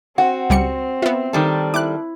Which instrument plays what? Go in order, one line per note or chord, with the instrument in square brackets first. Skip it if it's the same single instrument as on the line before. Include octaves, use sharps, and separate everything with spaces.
[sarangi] C4 [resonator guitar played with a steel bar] F#4 [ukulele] F#5
[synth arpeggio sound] C#2 G3 C#7
[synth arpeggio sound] B3 F4 [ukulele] E5
[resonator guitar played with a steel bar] D#3 G3 A4
[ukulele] E4 [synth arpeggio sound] D6 F#6